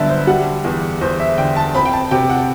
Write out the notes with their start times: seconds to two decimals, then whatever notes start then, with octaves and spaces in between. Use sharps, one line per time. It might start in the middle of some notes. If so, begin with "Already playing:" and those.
Already playing: G2 D3 F#3 B3 E5 A5
0.09 C5
0.27 G3 F#5
0.64 E2
1.01 E2 C5
1.20 E5
1.38 D3 G5
1.56 A5
1.74 C4 B5
1.85 G5
1.93 A5
2.11 C3 G5
2.29 F#5